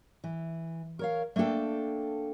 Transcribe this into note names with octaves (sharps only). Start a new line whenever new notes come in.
E3
A#4 C#5 F5
A3 A#3 D4 A4 G5